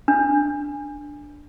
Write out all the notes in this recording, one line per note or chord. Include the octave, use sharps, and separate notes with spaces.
D4